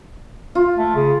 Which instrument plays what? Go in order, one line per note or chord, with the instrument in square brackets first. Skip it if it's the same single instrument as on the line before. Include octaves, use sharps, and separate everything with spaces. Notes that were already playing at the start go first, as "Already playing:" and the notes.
[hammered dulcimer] F4
[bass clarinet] A3
C#3